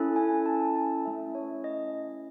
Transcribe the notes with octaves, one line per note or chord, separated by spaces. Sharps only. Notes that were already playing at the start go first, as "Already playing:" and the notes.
Already playing: C#4 E4 A4
G#5
A5
A5
A3 C#4 E4 E5
C#5
D#5